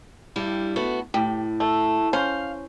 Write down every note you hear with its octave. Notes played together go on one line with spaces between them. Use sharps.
G2 G3 E4
A3 B3 F#4
A2 G4
A3
C#4 C5 F5